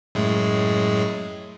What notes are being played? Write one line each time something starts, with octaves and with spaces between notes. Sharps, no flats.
F#2 A2 G#3